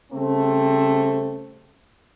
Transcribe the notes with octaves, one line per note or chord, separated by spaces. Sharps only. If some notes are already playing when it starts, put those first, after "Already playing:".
C#3 G3 A3 C4